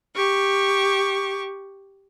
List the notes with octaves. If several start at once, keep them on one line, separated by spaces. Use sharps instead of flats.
G4 C#6